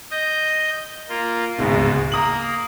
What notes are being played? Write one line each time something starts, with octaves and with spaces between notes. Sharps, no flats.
D#5 G6
A#3 F4
D1 G#1 C#2 G#2 B2
A#3 A#5 D#6 F#7